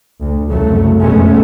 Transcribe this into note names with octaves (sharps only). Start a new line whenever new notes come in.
D2
C2 F#2 C#3 F#3 A3
F1 B2 G#3 A3 C#4